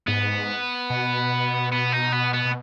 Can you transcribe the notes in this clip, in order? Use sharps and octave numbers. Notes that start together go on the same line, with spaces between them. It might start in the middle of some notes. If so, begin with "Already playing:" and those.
G#2 B3
B2
B3
D#4
B3
B3
B2